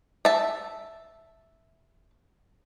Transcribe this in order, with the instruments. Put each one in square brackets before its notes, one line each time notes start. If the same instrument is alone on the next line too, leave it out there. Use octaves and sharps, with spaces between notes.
[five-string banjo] E5 A5